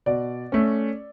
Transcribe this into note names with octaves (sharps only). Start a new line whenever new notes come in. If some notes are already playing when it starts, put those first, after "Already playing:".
B2 D5
A3 C#4